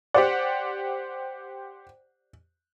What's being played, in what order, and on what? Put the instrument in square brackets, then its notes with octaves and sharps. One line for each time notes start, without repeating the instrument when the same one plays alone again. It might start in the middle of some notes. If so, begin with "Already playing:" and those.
[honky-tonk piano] G4 C5 F#5 [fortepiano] D5